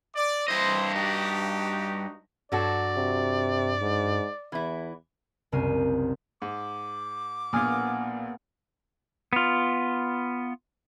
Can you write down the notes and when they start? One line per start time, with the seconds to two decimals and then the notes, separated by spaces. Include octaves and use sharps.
0.16 D5
0.48 G2 E4 C5 D#5
0.95 D#4 F#4 G4
2.52 G2 F#3 F#4 A4 D5
2.96 C3
3.82 G#2
4.52 E2 E3 E4
5.52 F#1 C2 G3 A#4 C7 D#7
6.42 G#2 D6
7.53 A#1 A#2 A#3 B3 G#5 D#6 F6
9.33 B3 F4